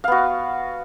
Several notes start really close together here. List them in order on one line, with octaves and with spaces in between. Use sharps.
F5 B3 F#4